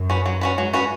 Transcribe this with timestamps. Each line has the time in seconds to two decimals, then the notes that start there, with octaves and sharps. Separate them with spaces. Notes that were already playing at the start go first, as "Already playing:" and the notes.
Already playing: F#2
0.10 C#4 F#4 B4
0.26 F#3
0.41 C#4 F#4 B4
0.57 G#2 F#3
0.73 C#4 F#4 B4